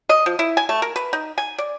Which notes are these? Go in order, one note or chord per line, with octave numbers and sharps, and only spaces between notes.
D#5
F3
E4
G#5
A3
A#4
B4
D#4
G#5
D5